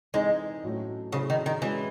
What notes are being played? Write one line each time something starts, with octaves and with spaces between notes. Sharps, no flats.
E3 G#3 C4 D#4
A2 F#3 A3 C#4
C#3 F#3 C#4 E4 G#4 C5
D#3
D#3
E3 G#3 C#4 F#4